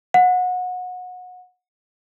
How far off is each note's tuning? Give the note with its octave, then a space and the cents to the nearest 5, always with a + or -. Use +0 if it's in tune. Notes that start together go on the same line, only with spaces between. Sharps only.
F#5 -25